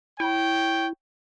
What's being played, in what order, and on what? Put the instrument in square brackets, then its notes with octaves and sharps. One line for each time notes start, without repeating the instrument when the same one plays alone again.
[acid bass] E4 [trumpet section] C#5 G5